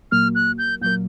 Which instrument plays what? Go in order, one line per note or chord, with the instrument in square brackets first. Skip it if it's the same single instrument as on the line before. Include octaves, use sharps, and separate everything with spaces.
[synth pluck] A#2 F#3 A#3 [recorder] F6
[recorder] F#6
G6
[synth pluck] A#2 F#3 A#3 [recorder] G6